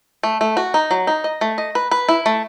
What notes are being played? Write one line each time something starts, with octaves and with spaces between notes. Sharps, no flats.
A3
A3
F#4
D#4
F#3
D#4
D#5
A3
D#5
B4
B4
E4
A3